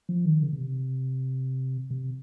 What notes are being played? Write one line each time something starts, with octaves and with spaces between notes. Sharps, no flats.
F3
D#3
C#3
C#3
C3
C3